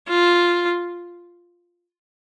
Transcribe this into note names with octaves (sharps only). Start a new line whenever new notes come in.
F4